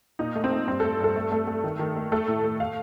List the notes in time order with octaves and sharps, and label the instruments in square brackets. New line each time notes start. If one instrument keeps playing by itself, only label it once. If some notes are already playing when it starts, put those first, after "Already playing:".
[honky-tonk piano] A#2 D#4
A3
C4
A3
G2 C4
A4
A3
G2 A4
A3
A3
A3
D#3
D#3
A3
A3 A4
A2
A3
F5